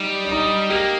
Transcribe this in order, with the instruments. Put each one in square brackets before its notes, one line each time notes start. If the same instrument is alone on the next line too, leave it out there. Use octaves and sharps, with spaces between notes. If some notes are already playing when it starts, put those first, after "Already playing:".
Already playing: [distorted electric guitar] G3 [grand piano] D#4
[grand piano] D4
D#4
[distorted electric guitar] A#3 [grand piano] G4